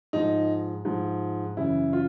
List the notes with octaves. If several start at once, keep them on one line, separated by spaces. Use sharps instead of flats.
G#2 F3 D#4
G#2 F3
F#2 C#3 E3 E4
F4